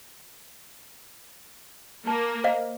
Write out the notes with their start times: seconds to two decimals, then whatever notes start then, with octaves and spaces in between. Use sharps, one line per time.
2.07 A#3 A5
2.44 C5 D#5 F5